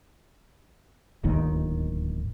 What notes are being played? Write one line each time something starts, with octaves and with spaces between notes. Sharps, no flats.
D1 G1 D#2 D#3